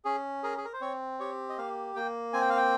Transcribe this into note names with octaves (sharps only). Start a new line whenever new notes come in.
C#4 G#4
G#4 A#4
G#4
A#4
C5
C4 C#5
G4 C#5
D#5
A#3 F5
A#3 G5
C4 G#5
G5
F5
G5